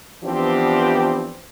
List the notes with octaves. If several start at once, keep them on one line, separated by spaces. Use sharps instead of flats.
E3 F3 B3 C4 D4 G4